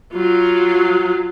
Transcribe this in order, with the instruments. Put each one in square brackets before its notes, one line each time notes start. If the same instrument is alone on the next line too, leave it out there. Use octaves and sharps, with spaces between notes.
[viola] F#3 F4